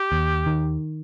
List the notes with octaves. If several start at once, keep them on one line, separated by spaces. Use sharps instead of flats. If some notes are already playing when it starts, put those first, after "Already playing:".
Already playing: G4
D#2
D#3